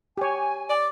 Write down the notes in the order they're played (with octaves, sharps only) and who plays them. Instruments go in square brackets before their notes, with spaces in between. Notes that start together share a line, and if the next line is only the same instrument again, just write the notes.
[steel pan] G4 C#5 [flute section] G#5
[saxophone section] D5